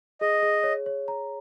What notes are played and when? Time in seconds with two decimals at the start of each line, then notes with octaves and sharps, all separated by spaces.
0.21 G#4 D#5
0.42 G#4
0.63 C#5
0.86 C#5
1.08 A#5